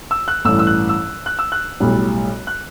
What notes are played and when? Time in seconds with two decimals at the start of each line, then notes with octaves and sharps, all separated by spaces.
0.11 E6
0.28 F#6
0.45 A1 G2 E3 E6
0.59 E6
0.67 F#6
0.89 E6
1.26 F#6
1.39 E6
1.52 F#6
1.80 B1 A2 G3
2.47 F#6